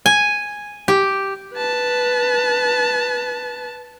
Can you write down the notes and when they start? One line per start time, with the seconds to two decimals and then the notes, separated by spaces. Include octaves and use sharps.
0.06 G#5
0.88 G4
1.55 B4 A5